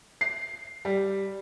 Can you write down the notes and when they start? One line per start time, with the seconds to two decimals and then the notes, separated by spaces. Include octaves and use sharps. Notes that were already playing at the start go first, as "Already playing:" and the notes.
0.21 C7
0.85 G3